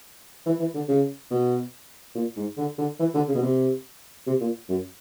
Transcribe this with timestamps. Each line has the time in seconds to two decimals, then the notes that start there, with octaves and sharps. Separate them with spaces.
0.46 E3
0.60 E3
0.74 D3
0.88 C#3
1.31 B2
2.15 A#2
2.36 G#2
2.57 D3
2.78 D3
2.99 E3
3.14 D3
3.28 C#3
3.35 B2
3.42 C3
4.27 C3
4.41 A#2
4.69 F#2